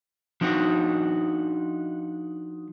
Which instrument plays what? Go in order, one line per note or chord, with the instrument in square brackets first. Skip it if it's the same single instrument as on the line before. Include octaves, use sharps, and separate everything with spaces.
[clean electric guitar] F3 D4 D#4 F#4